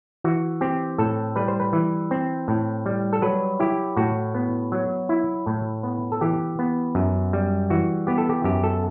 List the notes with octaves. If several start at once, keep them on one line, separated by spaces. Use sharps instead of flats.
E3 F#4
C4 G4
A2 A4
G3 B4
C5
B4
E3
C4
A2
G3
A4
F#3 B4
E4 G4
A2 F#4
B3
F#3
E4
A2
B3
A4
E3 G4
B3
F#2
G3
E3 F#4
B3 G4
A4
G4
F#2 G4
A4